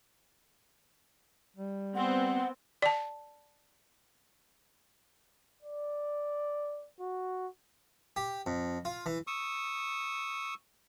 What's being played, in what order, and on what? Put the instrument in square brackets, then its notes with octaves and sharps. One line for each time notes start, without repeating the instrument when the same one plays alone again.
[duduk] G3
[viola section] B3 C4 [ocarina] F#5
[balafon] D5 A5
[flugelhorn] D5
F#4
[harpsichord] G4
F2
F4
E3
[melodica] C#6 D#6 E6